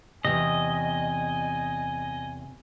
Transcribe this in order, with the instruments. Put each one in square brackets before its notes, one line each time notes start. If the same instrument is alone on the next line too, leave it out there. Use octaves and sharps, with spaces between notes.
[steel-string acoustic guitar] E2 C3 [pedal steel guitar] D#5 [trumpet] G#5